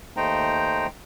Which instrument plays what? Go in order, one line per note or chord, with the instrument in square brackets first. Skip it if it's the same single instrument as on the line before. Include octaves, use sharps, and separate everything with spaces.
[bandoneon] D#2 A3 D#4 C5 G5 A#5